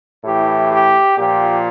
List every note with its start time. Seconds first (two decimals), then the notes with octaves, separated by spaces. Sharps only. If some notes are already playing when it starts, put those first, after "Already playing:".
0.24 A2 E3 G4
0.70 G4
1.17 A#2 F3 G4